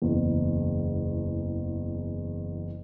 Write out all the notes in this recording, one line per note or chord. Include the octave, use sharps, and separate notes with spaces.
F#1 E2